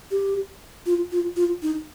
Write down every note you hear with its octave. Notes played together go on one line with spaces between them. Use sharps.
G4
F4
F4
F4
D#4